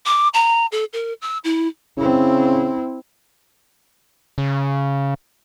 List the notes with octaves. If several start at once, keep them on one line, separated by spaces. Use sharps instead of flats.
D6
A#5
A4
A#4
E6
E4
C#3 C4 E4
C#3